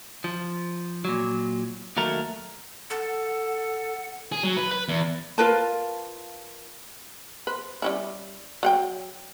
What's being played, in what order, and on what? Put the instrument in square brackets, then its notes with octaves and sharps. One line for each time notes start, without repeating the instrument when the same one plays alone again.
[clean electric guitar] F3
A#2 F#3
D#2 F#3 A3 A#4
[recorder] A4 [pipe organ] F#5
[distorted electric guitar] G#4
F#3
B4
B4
E2
[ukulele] F4 A#4 B4 A5
[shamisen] B4 C5
G3 C#4 E4
F#3 F#5 G5